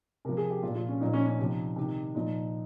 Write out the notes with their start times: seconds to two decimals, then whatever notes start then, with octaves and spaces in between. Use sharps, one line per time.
0.25 C3 F3 A#4
0.37 G#4
0.50 G4
0.63 F3 F4
0.67 A#2
0.75 F4
0.89 C#4
1.01 A#2 F3 D#4
1.13 C#4
1.26 C#4
1.39 C3 F3 D#4
1.76 C3 D#3
2.15 A#2 F3 D#4